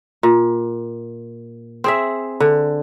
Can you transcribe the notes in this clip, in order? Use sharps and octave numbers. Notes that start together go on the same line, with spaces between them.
A#2
C4 G#4 E5
D3